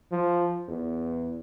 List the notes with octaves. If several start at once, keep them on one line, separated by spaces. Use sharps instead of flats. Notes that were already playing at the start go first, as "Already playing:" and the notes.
F3
E2